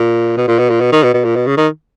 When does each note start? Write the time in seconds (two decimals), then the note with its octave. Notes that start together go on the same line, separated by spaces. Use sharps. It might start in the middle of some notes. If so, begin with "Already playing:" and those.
Already playing: A#2
0.37 B2
0.48 A#2
0.59 B2
0.70 A#2
0.80 B2
0.92 D#3
1.03 B2
1.14 B2
1.25 A#2
1.36 B2
1.47 C#3
1.57 D#3